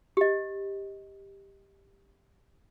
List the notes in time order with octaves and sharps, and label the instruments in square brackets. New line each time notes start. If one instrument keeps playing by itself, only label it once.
[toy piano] G4 D#5